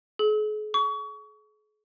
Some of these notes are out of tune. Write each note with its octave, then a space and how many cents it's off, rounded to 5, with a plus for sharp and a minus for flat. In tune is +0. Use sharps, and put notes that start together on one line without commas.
G#4 +45
C#6 +30